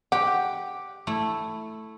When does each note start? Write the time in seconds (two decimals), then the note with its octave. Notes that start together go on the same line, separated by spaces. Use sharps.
0.12 G4 F#5
1.07 A3 E4